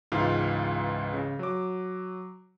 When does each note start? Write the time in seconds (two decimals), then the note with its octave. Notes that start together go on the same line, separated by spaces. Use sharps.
0.12 C#2 G#2 E3 F4 F5
1.13 C#3
1.39 F#3 D6